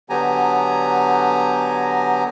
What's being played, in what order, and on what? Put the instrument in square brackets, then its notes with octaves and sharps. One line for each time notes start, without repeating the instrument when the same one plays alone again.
[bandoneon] D3 F#3 B3 G4 G#5 A#5